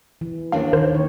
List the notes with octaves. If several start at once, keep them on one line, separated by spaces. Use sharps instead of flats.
E3
D#2 D4 F5 G5
D#3 A#4 C5
D#3 C#5